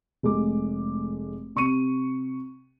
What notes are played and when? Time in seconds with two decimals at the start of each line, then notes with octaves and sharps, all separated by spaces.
0.23 F1 G#3 A3 D6
1.56 C3 C#6 C#7 D#7